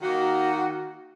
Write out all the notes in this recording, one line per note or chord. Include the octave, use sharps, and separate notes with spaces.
D#3 A#3 D#4 F#4